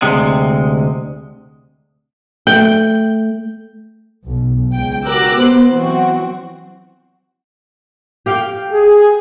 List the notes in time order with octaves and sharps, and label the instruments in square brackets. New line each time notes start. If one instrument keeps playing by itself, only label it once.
[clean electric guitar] D2 C3 G#3
[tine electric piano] A3 [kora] G5
[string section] B1
C#2 G5
F#4 G4 A#4 D6 E6 F#6
B3 C5
E3 F#3 C4 F#4
[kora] G4 F5 G5
[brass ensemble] G#4